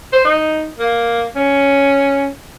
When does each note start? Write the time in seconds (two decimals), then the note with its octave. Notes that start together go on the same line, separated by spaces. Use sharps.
0.13 C5
0.25 D#4
0.79 A#3
1.36 C#4